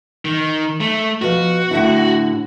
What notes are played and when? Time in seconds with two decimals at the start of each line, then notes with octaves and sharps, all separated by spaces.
0.25 D#3
0.81 A3
1.22 B2 F3 F#4
1.71 A2 D3 E4